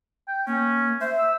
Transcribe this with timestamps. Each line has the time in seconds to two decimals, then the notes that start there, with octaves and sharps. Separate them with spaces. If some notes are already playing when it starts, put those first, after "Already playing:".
0.28 G5
0.47 A#3 C#4
1.01 C5 E5
1.18 E6